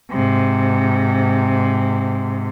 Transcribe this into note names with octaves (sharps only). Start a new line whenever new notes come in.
G#2 C3